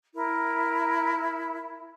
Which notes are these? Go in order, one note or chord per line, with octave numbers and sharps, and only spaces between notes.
E4 A#4